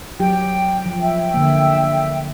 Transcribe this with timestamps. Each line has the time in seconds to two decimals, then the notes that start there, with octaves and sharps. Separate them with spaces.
0.20 F#3 G4 G5
0.85 F3
1.00 E5 G5
1.34 D3 A#3